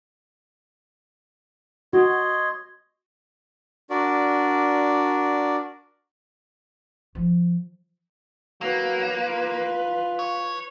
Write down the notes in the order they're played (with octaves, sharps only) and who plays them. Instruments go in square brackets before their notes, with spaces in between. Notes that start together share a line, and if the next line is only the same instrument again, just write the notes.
[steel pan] F#4 [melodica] C#5 D#5 C6
[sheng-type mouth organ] D4 F#4 A#4 D5
[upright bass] F3
[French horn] F#3 [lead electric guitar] A#3 [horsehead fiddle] B4
[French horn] F4
[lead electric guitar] C#5